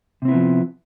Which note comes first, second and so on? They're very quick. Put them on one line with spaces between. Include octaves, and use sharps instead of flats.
C3 C4 E4 B3 F3